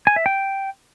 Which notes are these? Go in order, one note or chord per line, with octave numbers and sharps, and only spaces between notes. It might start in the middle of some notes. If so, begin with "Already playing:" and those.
G#5
E5
G5